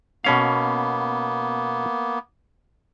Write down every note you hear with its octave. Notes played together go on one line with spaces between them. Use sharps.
B2 A#3 B3 C#4 F5